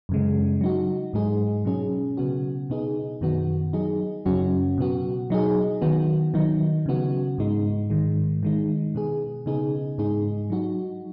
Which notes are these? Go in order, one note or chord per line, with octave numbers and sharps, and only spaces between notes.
F#2 C#3 G#3
F#3 D#4 F#4
G#2 G#3 D#4 G#4
B2 F#3 C#4 G#4
C#3 B3 F#4
B2 B3 D#4 G#4
F#2 D#3 B3 F#4
F#3 D#4 G#4
F#2 C#3 F#3 C#4 F#4
B2 B3 F#4
F#3 D#4 G#4
D#3 B3 F#4
D#3 F#3 D#4
C#3 B3 F#4
G#2 G#3 D#4
G#2 D#3 G#3
D#3 G#3 D#4
B2 B3 G#4
C#3 B3 D#4 G#4
G#2 G#3 D#4 G#4
F#3 D#4 F#4